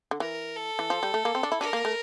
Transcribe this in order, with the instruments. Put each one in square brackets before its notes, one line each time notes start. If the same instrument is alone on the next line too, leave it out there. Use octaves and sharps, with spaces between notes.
[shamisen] D3
[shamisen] E3 [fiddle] A#4
[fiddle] A4
[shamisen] E3
F3
G3
A3
A#3
C4
D4
E4
[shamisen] D4 [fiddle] A#4
[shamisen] A#3
A3